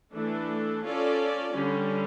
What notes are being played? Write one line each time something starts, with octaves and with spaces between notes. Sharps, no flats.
E3 A3 D4 A4
C#4 F4 A4 D5
D3 G3 C#4